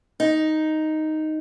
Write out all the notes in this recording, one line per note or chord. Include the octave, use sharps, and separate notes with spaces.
D#4